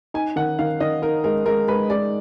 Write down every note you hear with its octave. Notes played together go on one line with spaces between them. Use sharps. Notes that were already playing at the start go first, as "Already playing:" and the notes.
D#4 G#5
D#3 F#5
D#3 F5
D#3 D#5
D#4 A#4
G#3 A#4
G#3 A#4
G#3 B4
G#3 D5